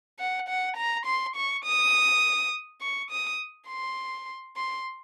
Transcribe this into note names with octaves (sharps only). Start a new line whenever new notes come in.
F#5
F#5
A#5
C6
C#6
D#6
C#6
D#6
C6
C6